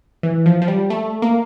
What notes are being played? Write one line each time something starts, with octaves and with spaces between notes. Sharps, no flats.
E3
F3
F3
G3
A3
A#3